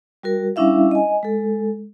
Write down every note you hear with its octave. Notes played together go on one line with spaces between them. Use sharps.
G3 F#4 A#4
G3 C#4 D4 E4 E5 F5
D#5 G#5
G#3 A4